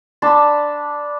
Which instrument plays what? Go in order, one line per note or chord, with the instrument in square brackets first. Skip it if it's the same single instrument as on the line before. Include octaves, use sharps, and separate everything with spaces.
[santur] D4 A5 B5 C6